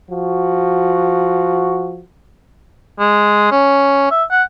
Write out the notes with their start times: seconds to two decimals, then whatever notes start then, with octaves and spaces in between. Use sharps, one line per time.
0.10 F3 F#4
3.00 G#3
3.52 C#4
4.11 E5
4.31 F#5